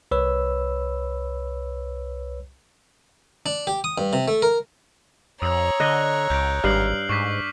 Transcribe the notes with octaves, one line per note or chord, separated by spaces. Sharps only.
C2 B4 C#5 B5 E6
D4
G4
D#6
G2
C3
A3
A#4
F2 C#5 A#5 D#6 E6
D3 D#5 F#6
C#2 G6 D7
G#1 G2 F6 C7 F#7
G#2 C#6 D6 B6